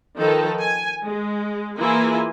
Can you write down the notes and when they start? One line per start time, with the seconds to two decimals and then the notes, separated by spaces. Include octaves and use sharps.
0.17 D#3 F3 D#4 A4 B4
0.62 G#5
1.04 G#3
1.77 E3 A#3 E4 F4 G#4 G#5